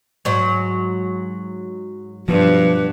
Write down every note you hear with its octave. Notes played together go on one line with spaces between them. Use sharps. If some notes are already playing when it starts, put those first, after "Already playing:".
G#2 F#3
G2 B2 F3 B4